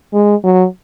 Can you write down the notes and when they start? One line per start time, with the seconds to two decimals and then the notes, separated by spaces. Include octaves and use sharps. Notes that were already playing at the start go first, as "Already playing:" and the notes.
0.13 G#3
0.44 F#3